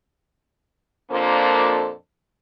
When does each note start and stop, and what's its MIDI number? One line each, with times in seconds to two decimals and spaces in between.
1.12 1.92 41
1.12 1.92 46
1.12 1.92 58
1.12 1.92 62
1.12 1.92 69
1.12 1.92 72